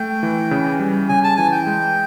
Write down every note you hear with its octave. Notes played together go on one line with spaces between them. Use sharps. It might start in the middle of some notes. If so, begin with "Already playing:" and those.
Already playing: A3 G5
E3
C#3
G3
C#3 G#5
A5
E3 G#5
G5
G#3